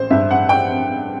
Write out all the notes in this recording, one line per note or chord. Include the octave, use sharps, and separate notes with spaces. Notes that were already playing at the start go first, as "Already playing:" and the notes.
Already playing: A1 C5
G2 E5
F#5
G5